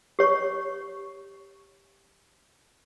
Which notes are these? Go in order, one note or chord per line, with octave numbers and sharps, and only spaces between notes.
G4 C#5 C#6